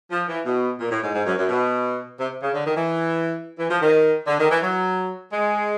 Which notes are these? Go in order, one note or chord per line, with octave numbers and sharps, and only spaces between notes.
F3
E3
B2
A#2
A2
G#2
G#2
F#2
F#2
B2
C3
C#3
D3
D#3
E3
E3
F3
D#3
D3
D#3
E3
F#3
G#3